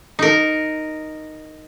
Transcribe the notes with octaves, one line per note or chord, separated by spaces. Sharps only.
D#4 A#4